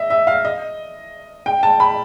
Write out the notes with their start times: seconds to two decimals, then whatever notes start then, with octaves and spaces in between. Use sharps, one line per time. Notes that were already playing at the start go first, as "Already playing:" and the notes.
Already playing: D#5 E5
0.10 E5
0.27 F5
0.45 D#5
1.46 G5
1.63 A5
1.80 B5